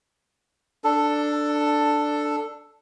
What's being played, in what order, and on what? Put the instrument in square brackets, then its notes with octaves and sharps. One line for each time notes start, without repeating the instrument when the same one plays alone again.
[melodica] D4 A4